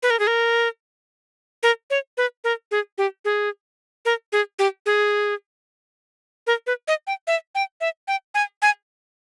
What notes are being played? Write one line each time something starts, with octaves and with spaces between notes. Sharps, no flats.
B4
A#4
G#4
A#4
A#4
C#5
B4
A#4
G#4
G4
G#4
A#4
G#4
G4
G#4
A#4
B4
D#5
G5
E5
G5
E5
G5
G#5
G#5